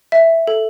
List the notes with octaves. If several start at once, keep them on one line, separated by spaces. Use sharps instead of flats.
E5
A4